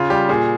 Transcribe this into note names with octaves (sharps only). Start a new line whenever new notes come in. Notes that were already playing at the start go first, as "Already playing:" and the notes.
Already playing: C#3 F4
G3 G4
A#2 G#4